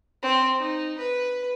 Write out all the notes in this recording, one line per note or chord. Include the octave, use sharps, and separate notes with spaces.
C4
D#4
B4